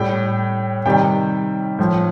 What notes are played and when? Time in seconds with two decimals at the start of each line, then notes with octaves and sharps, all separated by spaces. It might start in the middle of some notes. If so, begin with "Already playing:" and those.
Already playing: A2 G3 G5
0.85 C3 D#3 G3 G5
1.79 A2 F3